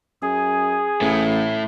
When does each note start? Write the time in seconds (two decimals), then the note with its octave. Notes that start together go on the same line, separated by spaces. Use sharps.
0.22 F#2 G#4
1.01 A1 A2